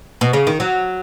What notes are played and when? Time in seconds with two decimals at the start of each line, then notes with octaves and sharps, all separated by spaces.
0.21 B2
0.33 C#3
0.47 D#3
0.60 F#3